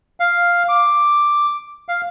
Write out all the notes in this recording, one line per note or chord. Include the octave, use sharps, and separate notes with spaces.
F5
D6
F5